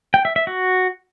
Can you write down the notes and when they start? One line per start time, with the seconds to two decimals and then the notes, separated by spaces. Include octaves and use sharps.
0.14 G5
0.25 E5
0.36 E5
0.47 F#4